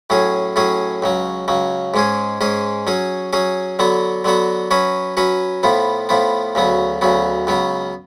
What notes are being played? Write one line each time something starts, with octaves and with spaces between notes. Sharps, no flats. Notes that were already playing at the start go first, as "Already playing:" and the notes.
A2 F#3 C#4 G#4
A2 F#3 C#4 G#4
C#2 C#3 F#3
C#2 C#3 F#3
G#2 G#3 C#4 G#4
G#2 G#3 C#4 G#4
F#3 C#4 G#4
F#3 C#4 G#4
D3 F#3 B3 F#4
D3 F#3 B3 F#4
F#3 C#4 F#4 B4
F#3 C#4 F#4 B4
A2 F3 B3
A2 F3 B3
D2 C#3 F#3 B3
D2 C#3 F#3 B3
C#2 C#3 F#3 B3